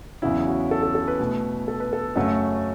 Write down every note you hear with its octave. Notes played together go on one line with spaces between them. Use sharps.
E2 C#3 F#3 E4
F#4
A4
A4
A4
B4
B2 A3
A4
B4
A4
F#2 C#3 F#3 A3